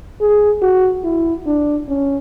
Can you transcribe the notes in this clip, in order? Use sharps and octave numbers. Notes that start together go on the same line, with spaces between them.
G#4
F#4
E4
D4
C#4